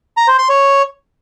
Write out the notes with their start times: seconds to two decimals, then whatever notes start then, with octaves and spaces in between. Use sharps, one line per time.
0.17 A#5
0.28 C5
0.38 C6
0.49 C#5